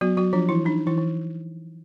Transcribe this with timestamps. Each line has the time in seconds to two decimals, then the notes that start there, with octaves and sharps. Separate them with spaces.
0.01 F#3 B3 F#4
0.17 F#3 F#4
0.33 F3 D4 F4
0.49 E3 E4
0.65 D4 D#4
0.87 E3 E4
0.98 E3